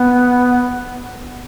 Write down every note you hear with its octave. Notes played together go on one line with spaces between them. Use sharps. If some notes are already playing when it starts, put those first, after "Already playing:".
Already playing: B3